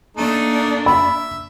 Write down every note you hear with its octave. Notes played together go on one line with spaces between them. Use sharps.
A3 A#3 D4 D#4
E5 B5